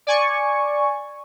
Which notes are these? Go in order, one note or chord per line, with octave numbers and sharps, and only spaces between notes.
D5 G#5 C#6